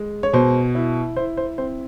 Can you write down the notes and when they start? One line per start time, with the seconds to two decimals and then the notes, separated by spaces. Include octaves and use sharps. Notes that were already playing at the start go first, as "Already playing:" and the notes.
Already playing: G#3
0.23 C#5
0.33 B2 C5
0.75 E4
1.16 E4 C5
1.37 C5
1.58 C4 C5